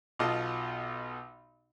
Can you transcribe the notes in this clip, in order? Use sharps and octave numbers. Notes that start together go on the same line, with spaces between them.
B1 B2 F4 D#5 A5